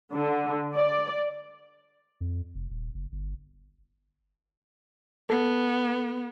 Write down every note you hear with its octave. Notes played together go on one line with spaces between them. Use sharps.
D3
D5
F2
F1
D#1
F#1
G1
B3 A4